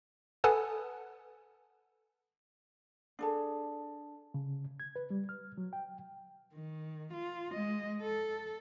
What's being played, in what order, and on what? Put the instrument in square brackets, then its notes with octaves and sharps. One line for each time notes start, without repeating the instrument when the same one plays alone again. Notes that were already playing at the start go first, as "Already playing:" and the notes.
[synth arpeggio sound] A4 B4 F#5 G#5 A5 D#6
[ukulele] D4 G#4 A4
[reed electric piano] C#3
G#6
B4
G3
F6
F#3
G5
[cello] D#3
F4
G#3 D#5
A4